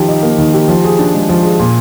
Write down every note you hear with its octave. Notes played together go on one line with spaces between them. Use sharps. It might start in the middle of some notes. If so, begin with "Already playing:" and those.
Already playing: D#3 F3 G4
D#4
A#3
D#3
G4
F3
G#4
D4
G#3
F3
G#4
A#2